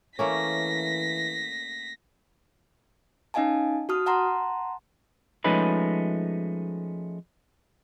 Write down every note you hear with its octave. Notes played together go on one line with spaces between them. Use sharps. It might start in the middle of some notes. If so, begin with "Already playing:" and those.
E3 A3 A#3 C#4 A#6 B6
C#4 D#4 D#5 F5 G#5 A5
F#4 A5 D#6 F6
F#5 A5 A#5 C6
F3 G#3 A3 C#4 D#4 B4